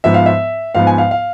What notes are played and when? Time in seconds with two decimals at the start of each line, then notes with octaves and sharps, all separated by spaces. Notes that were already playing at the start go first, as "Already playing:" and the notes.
0.04 G#2 F3 B3 E5
0.14 F5
0.26 E5
0.75 G#2 F3 B3 F5
0.87 G#5
0.98 F5
1.11 F5